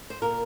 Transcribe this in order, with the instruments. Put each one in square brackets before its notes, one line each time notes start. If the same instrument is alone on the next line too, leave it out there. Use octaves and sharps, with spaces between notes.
[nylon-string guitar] C5
A#2 A#4